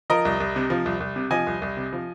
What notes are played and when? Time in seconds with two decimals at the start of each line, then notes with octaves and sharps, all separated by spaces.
0.10 F3 A#4 D#5
0.25 C2
0.40 C2
0.56 C3
0.70 F3
0.86 C2
1.00 C2
1.16 C3
1.31 F3 D#5 G#5
1.47 C2
1.62 C2
1.77 C3
1.93 F3